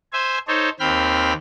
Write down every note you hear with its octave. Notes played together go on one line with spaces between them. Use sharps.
C5 E5 G#5
D#4 A4 C5 C#5
D#2 C4 G5 B5 F6